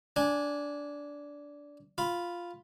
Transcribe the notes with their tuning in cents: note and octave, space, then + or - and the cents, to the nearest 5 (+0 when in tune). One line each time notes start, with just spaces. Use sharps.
D4 -15 G#5 +0
F4 +0 B5 +0